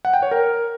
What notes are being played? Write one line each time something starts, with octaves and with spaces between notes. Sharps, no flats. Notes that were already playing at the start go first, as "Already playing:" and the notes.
F#5
G5
C#5
A#4